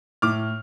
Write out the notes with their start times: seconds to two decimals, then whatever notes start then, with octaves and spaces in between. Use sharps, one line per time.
0.22 A2 D6 F6